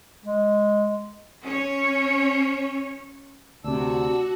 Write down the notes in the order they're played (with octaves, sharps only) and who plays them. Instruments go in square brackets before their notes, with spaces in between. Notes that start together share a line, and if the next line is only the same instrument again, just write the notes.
[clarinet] G#3
[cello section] C#4 C#5
[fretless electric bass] D2 C3 [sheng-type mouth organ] D4 E6 [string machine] F#4